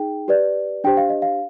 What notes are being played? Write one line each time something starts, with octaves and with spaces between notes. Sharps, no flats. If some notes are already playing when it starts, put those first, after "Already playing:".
Already playing: D#4 G#4 G5
G4 B4 D5
D4 G4 C5 G5
F5
D#5
F5